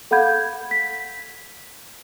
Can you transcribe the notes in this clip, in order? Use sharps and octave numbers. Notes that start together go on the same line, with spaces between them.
A4 F5 F#5 B5 G6 G#6
B6